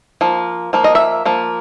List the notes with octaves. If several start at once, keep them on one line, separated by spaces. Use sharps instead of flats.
F3 A#3
F3 A#3
D#5
E5
F3 A#3